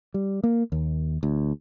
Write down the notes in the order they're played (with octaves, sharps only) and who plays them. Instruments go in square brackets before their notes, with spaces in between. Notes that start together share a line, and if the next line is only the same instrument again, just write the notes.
[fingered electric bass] G3
A#3
D#2
D2